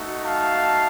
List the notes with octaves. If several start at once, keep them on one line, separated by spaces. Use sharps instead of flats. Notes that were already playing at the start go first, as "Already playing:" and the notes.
Already playing: A3 D#4 F#4
F5 A5